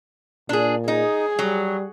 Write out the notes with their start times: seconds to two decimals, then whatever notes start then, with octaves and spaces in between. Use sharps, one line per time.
0.49 A#2 D4 G#4
0.88 D#4 G#4
1.39 F#3 G3